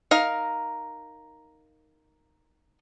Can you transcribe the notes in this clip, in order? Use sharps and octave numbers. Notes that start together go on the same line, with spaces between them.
D#4 A#4 F5